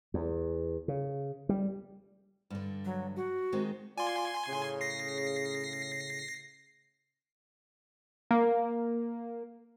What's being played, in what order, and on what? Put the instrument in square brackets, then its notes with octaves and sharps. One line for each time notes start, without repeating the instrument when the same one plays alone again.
[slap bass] E2
C#3
G3
[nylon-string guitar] G2 D3
[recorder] F#3
F#4
[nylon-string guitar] D#3 G#3 C4
[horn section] F4 D5 [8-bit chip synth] G#5 C6
[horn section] A2 C#3
[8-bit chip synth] A#6 C7
[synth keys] A#3